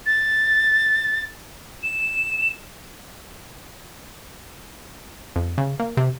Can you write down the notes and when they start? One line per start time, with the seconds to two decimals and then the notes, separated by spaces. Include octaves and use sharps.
0.06 A6
1.83 E7
5.36 F2
5.58 C#3
5.80 A#3
5.97 C3